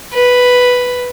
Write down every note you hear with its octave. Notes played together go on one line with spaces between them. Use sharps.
B4